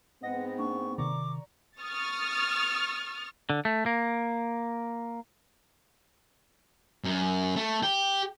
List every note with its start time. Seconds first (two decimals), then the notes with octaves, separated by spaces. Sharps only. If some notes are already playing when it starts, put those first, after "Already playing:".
0.23 G#2 B3 C4 D#5 F#5 A#6
0.59 A#3 D4 C#6
0.98 C3 D#3 D5 A#5 C#6 D6
1.81 C#6 D#6 F6 A6
3.50 D3
3.65 A3
3.86 A#3
7.04 F#2
7.56 A3
7.83 G4